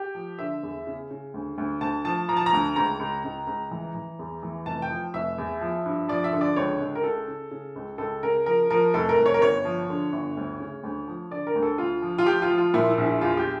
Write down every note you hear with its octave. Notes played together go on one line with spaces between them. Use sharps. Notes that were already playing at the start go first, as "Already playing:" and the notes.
Already playing: G4
F3
D3 E5
E2
C#3
C#3
D2
D2
D2 A5
F3 A5
F3 A#5
A5
A#5
D2
C#2 A#5
C#2
C#2
C#2
E3
E3
E2
E3
F1 A5
G5
F3
F1 E5
E2
F3
G2
F3 D5
E5
D3
D5
C#2 C#5
C#2
A#4
C#3 A4
C#3
C#3
C#2
C#2 A4
C#3 A#4
F3 A#4
F3 A#4
F1 A4
A#4
F1
C#5
A#4
G1 C#5
F3
D3
G1
D2
C#3
D2
F3
D3 D5
A#4
D2
A4
D2 F4
F3
F4
F3 G4
F4
F3
F4
A#2 E4
E4
A#1
E4
E2 F4
G4